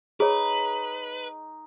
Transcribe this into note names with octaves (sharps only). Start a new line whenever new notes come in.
D#4 G#4 B4 C#5